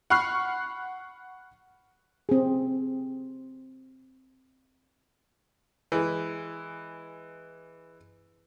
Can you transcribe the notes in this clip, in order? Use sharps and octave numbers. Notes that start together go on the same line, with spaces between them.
F#5 B5 C#6 F6 F#6 C7
C4 G#4
E3 G#3